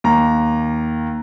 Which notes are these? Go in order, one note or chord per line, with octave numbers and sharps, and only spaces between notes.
D#2 A#5